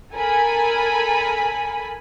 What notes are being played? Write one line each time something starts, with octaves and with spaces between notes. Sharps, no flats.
A4 A#4 G#5 B5